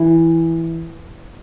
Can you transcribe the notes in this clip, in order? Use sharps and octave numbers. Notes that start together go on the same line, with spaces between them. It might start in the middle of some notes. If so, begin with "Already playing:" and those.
Already playing: E3